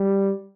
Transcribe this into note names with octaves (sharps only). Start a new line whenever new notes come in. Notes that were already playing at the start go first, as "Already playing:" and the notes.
Already playing: G3